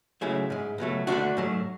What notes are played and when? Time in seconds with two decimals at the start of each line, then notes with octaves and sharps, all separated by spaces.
0.21 C#2 C#3 F#3 A3 E4 G#4
0.50 G#2 G#3
0.78 C#2 B2 F#3 A3
1.07 D2 D3 A3 D4 F#4
1.37 G#2 F#3 A3